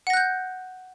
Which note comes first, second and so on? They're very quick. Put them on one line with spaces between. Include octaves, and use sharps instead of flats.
F#5 A#6 F#6 G6